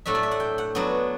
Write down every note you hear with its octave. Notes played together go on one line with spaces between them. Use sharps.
A2 F#3 A3 D4 E5
D5
E5
F#5
G5
F#5
F#3 B3 D4